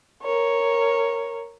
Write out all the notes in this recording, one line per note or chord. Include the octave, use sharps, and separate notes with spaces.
A#4 C#5